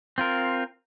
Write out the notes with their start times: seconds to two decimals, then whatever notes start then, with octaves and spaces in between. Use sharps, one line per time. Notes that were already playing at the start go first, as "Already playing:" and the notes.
0.18 C4 F4 A#4